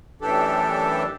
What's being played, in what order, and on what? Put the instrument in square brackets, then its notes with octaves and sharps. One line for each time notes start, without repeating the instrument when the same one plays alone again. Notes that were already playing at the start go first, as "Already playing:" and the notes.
[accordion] F#2 A2 E3 D4 G4 A4